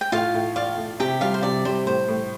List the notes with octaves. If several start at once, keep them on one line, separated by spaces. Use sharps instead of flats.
G5
A2 F4 F5
A2
F4 D5 F5
A2
C3 G4 G5
G3 F4 F5
C5
C3 D5
G3 C5
A2 C5
A2